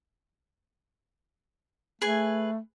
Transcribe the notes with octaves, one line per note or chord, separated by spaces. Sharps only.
A3 G#4 B4 G#5